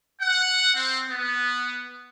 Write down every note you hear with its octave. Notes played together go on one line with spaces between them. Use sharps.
F#5
C4
B3